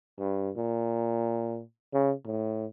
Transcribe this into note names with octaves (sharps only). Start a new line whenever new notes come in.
G2
A#2
C#3
A2